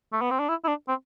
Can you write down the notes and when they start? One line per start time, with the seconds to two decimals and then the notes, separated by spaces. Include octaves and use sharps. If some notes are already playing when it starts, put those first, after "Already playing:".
0.13 A3
0.21 B3
0.31 C4
0.39 D4
0.49 E4
0.64 E4
0.68 D4
0.88 C4